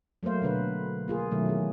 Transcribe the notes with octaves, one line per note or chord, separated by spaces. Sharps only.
F#3 A3 A#3 C5 F5
B2 D3 B4 C5
A#3 F4 G#4
B2 D#3 F#3 A3
E3 G#4